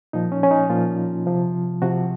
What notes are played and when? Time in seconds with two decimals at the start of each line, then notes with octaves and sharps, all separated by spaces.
0.13 A#2 F3 D#4
0.32 C#4
0.43 C#4
0.51 D#4
0.69 A#2 F3 F4
1.26 C3 F3
1.82 C3 F3 F#4